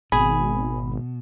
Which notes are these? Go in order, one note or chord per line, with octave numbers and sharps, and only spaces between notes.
G#1 B2 G#4 B5